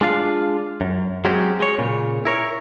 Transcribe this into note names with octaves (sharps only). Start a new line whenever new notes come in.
G#3 D4 F4 F5
F#2
F#3 G#3 C4 C#4 G4
G#3 C#5
A#2 C#3
E4 A#4 C#5